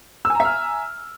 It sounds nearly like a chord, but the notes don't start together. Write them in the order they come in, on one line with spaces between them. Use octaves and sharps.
E6 G#5 A#5 E5 F6